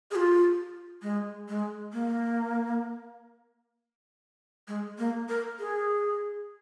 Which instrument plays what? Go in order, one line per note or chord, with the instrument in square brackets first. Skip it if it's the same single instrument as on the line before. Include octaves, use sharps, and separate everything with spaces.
[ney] G#4
F4
G#3
G#3
A#3
G#3
A#3
A#4
G#4